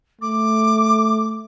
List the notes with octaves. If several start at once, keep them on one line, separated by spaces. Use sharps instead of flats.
A3 D6